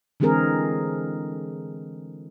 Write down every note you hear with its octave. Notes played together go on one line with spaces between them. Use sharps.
D3 E3 G#3 C4 G#4 A#4